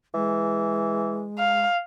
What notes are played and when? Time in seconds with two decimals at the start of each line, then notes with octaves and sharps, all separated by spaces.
0.14 E3 G#3
1.38 F5